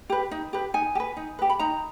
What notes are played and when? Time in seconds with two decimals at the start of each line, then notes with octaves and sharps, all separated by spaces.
0.10 G4 B4
0.31 D#4
0.53 G4 B4
0.74 D#4 G#5
0.95 G4
1.00 B4
1.17 D#4
1.39 G4 B4
1.50 B5
1.59 D#4 A#5